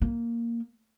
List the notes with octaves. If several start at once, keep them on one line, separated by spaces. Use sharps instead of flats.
A#3